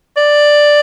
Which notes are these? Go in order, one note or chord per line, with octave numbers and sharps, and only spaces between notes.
D5